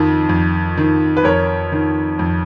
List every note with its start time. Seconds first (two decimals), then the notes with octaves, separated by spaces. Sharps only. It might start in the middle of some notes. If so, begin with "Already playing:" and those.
Already playing: F2 D#3
0.29 F2
0.77 D#3
1.17 B4
1.24 F2 A#4 C#5
1.72 D#3
2.19 F2